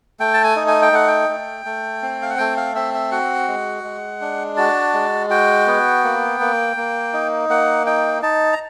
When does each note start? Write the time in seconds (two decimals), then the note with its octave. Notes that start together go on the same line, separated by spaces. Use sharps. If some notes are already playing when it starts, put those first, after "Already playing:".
0.20 A3 G5
0.34 A5
0.44 G#5
0.56 D#4
0.68 G#5
0.82 G5
0.92 A3 F#5
1.08 G5
1.29 A3
1.65 A3
2.02 C4
2.22 F5
2.30 F#5
2.38 A3 G5
2.57 F5
2.75 C4 E5
2.94 E5
3.12 F#4 F#5
3.48 G#3
3.84 G#3
4.21 D4
4.57 F#4 A5
4.94 G#3
5.30 F#4 G5
5.67 B3
6.04 A#3
6.40 A#3
6.77 A#3
7.13 D#4
7.49 A#3 F#5
7.86 D#4 G5
8.22 D#4 A5
8.53 A#5